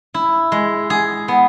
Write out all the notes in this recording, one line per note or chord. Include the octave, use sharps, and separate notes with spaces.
E4
G#3
G#4
B3